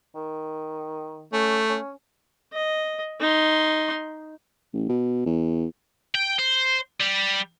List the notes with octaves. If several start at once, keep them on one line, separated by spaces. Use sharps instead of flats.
D#3
A3 C#4
C#4
D#5
D#4 C6
A1
B2
E2
G5
C5
G3